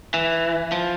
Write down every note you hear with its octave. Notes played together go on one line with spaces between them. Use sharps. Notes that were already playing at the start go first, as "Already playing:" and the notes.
E3
F3